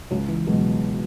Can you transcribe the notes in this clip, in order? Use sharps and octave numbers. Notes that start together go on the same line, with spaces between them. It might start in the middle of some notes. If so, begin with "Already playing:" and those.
C#2 F#3
E3
B2 F#3 G#3